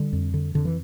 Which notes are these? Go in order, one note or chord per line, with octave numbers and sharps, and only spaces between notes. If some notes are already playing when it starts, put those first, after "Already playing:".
Already playing: D3 G3
F2
D3
F2 D3
E3